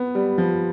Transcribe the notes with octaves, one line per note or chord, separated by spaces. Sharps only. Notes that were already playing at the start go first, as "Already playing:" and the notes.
Already playing: B3
G3
F3